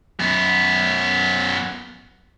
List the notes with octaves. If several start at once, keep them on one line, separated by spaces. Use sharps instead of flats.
F#2 B3